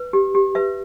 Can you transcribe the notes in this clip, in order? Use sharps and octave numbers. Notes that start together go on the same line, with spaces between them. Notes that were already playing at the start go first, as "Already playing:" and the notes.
Already playing: B4
G4
G4
B4 E5